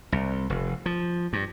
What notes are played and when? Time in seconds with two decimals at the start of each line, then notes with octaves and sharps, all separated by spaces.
0.12 C2
0.50 F1
0.86 F3
1.33 G2